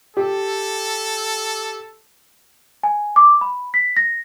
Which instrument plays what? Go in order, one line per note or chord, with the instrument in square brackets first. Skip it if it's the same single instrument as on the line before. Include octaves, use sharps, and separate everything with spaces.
[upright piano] G4 [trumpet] A4
[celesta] G#5
D6
B5
B6
A#6